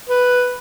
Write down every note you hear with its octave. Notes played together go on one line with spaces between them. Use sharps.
B4